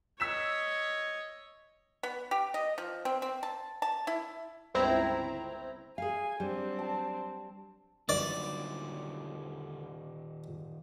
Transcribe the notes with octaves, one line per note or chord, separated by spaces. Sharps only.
C#5 D#5 E6 B6 E7
B3
G4
D#5
F3
C4
C4
A5
A5
E4
G1 C#2 C4 E4 A#5
G#4 F5 G#5
F#3 G3 C4 D4
A5
D3 D#3 F#3 G3 D5